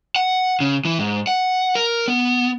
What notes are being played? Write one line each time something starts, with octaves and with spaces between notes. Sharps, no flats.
F#5
C#3
E3
G#2
F#5
A#4
B3